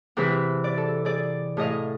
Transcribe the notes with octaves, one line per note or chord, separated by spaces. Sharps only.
C3 E3 C4 G#4 B4 E5
D5
A4
G#4 D5
A2 G#4 D#5 F5